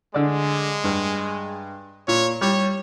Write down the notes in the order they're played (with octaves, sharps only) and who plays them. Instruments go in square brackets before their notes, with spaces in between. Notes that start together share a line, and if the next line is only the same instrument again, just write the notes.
[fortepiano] D3 D5 [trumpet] G#3
[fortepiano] G2
[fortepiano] A#2 [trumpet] C#5
[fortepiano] G3 [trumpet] C#5